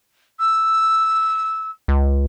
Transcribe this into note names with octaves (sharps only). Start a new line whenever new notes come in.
E6
C#2